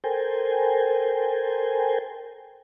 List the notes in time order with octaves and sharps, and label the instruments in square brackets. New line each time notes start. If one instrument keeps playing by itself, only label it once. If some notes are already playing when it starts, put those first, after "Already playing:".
[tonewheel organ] A4 A#4 C5 G5 G#5